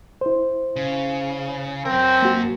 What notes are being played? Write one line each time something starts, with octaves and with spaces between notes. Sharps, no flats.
E4 C5
C#3
F#2 C4 A#4
A#3 F#4